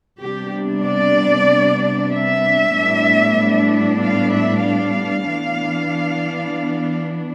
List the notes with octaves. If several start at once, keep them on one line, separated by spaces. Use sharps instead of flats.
C3 G3 B3 D4 G4
D5
E5
A2 G3 B3 D4
F5
E5
F5
E3 B3 D4